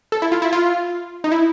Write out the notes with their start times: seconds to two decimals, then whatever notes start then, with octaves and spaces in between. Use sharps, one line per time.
0.12 A4
0.22 E4
0.32 F4
0.42 E4
0.53 F4
1.24 D#4
1.32 E4